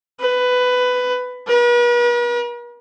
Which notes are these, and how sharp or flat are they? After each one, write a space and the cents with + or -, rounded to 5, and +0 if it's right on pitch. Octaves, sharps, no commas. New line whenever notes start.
B4 +15
B4 -45